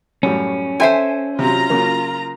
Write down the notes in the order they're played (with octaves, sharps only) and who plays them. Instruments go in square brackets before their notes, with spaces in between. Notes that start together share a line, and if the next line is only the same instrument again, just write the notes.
[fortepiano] F#2 A2 G3 [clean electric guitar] C#4
[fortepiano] A4 G5 C6 [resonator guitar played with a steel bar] C5 E5 G#5
[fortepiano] C3 F#3 [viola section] F4 A#5
[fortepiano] C#3 F#3 A#3